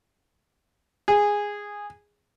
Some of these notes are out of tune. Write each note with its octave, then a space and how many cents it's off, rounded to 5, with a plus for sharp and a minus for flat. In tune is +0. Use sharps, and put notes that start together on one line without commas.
G#4 -10